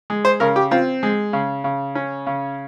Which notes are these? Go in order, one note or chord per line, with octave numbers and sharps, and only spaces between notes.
G#3
C5
C#3 A#4
G4
C4 F4
G#3
C#3
C#3
C#4
C#3